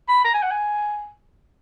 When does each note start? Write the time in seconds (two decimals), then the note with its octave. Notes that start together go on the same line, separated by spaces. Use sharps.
0.08 B5
0.25 A#5
0.34 G#5
0.43 F#5
0.51 G#5